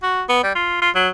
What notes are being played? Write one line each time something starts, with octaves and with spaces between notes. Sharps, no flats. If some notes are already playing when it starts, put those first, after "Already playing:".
F#4
B3
G3
F4
F4
F#3